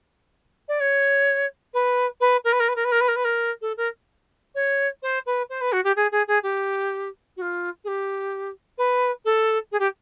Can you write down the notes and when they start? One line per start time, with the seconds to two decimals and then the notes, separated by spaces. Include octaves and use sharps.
0.68 D5
0.80 C#5
1.74 B4
2.20 B4
2.44 A#4
2.53 B4
2.60 A#4
2.68 B4
2.76 A#4
2.85 B4
2.92 A#4
3.01 B4
3.08 A#4
3.16 B4
3.25 A#4
3.62 A4
3.77 A#4
4.55 C#5
5.03 C5
5.26 B4
5.50 C5
5.61 B4
5.72 F#4
5.84 G4
5.96 G#4
6.12 G#4
6.28 G#4
6.43 G4
7.37 F#4
7.42 F4
7.84 G#4
7.88 G4
8.78 B4
9.25 A4
9.72 G#4
9.79 G4